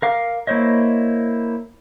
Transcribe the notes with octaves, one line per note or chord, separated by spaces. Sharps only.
A#4 F5 D6
A#3 E4 C5 C#5 D#5